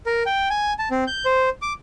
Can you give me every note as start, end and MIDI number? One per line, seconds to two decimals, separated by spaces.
0.06 0.23 70
0.26 0.49 79
0.50 0.74 80
0.79 0.89 81
0.91 1.04 60
1.07 1.25 91
1.25 1.49 72
1.62 1.73 86